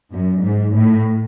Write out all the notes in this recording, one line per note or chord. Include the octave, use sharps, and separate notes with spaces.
F#2
G#2
A2